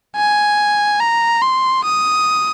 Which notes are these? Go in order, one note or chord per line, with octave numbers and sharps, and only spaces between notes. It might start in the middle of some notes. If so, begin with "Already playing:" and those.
G#5
A#5
C6
D#6